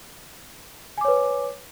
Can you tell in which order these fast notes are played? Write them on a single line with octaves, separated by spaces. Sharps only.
G#5 D6 C#5 B4